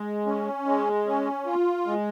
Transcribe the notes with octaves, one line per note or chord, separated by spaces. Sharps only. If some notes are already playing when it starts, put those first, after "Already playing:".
Already playing: G#3
C#4
G#3
C#4
F4
G#3